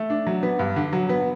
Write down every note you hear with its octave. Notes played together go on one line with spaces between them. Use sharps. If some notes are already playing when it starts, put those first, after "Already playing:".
Already playing: A3
D4
F#3
B3
G2
D3
F#3
B3